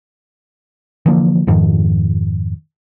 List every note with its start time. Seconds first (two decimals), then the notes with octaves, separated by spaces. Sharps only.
1.06 D3 E3 F3 A#3
1.47 F2 G#2 D#3 F3